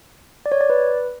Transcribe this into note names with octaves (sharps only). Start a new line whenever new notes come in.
D5
C#5
D5
B4